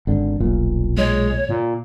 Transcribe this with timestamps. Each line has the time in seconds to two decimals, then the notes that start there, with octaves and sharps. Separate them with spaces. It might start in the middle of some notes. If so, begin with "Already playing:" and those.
0.07 G#1 D3
0.40 D#1 B1 A#2
0.97 G#3 C#5
1.49 A#2